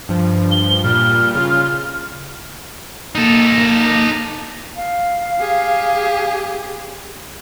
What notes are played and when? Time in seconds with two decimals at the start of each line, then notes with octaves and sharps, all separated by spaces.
0.09 G2 F3
0.52 G7
0.84 A#2 G3 F6
1.35 C#3 F4
3.15 A#3 D#4 A4
4.76 F5
5.40 G4 G#4